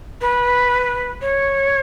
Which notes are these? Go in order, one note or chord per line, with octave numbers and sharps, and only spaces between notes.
B4
C#5